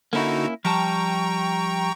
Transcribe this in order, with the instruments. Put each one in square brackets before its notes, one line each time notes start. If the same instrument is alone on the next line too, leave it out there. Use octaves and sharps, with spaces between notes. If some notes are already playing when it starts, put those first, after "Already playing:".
[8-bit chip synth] D3 D#4 F#4 [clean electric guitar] A#3 C#4 E4
[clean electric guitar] F3 G3 A5 [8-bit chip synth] G5 A#5 C#6